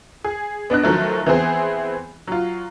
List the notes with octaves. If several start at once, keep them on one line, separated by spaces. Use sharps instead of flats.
G#4
B3 D4 D#5 F#6
D#3 F3 F#3 A3
E3 B3 C4 G#4
F#3 F4